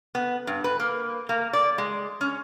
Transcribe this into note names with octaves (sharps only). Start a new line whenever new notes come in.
B3
G2
B4
A#3
A#3
D5
G#3
C#4